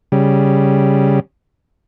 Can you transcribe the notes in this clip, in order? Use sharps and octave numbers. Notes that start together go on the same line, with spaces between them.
C#3 G3